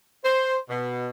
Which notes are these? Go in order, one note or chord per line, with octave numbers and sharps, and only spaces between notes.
C5
B2